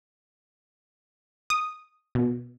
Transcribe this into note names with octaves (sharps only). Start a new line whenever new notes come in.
D#6
B2